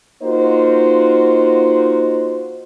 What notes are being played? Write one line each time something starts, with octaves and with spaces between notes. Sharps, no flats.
A#3 D#4 F4 F#4 C5